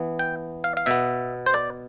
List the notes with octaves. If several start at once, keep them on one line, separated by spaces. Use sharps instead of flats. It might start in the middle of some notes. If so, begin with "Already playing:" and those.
Already playing: E3 B3
G5
F5
F5
B2 B3 E5
C5
D5